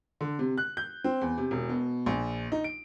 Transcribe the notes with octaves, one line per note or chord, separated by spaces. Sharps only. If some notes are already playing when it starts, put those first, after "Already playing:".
D3
C3
F#6
G6
C4
E2
C3
E1
B2
A#1
D#4
D7